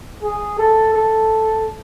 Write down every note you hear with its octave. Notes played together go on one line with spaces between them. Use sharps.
G#4
A4
A4